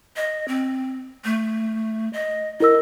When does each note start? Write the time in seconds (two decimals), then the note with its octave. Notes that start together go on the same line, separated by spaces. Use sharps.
0.16 D#5
0.48 C4
1.25 A3
2.13 D#5
2.60 E4 A#4 D#5 E6